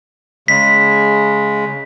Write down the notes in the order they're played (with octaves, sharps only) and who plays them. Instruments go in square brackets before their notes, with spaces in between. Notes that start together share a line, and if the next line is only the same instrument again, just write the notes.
[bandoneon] C#3 G#3 [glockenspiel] B6